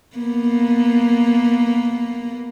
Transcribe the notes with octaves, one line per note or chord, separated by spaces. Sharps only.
A#3 B3